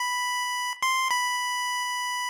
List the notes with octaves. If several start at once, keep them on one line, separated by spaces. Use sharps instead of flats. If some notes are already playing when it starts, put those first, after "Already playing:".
Already playing: B5
C6
B5